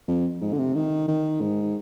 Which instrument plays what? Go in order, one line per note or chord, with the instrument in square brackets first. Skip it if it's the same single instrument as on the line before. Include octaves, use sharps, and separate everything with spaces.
[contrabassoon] F2
G#2
D3
C3
D#3
D#3
G#2